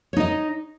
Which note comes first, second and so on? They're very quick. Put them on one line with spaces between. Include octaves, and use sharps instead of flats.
C#5 D#4 D#5